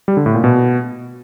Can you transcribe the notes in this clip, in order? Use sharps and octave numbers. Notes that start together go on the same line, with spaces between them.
G3
D3
A2
A#2
B2